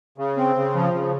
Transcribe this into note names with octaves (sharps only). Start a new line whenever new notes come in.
C#3
C4
C#3
F3
C#3